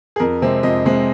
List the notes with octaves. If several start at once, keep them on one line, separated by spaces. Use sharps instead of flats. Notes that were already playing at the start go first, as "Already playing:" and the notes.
G#4
F2 A#4
C3 G#3 C4
F2 D#5
C3 G#3 C4